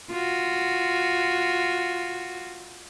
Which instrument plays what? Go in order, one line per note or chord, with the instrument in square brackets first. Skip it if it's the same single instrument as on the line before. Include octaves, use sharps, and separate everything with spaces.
[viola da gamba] F4 F#4